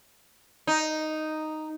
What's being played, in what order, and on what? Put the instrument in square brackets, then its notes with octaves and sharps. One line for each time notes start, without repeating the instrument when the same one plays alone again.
[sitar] D#4